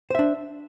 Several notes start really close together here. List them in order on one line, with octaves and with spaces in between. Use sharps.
C5 E5 D4